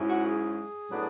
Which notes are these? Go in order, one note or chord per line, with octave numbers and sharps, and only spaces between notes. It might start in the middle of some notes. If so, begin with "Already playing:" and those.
Already playing: G#2 F#3 C#4 E4
F#4
G#4
A2 F#3 B3 D4